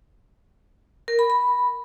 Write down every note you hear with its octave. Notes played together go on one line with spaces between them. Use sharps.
A#4
B5
B5